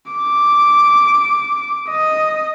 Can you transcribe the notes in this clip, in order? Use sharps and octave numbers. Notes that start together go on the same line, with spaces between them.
D6
D#5